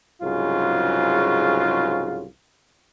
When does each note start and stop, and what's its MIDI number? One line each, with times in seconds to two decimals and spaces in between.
0.22 2.26 36
0.22 2.26 44
0.22 2.26 49
0.22 2.26 54
0.22 2.26 65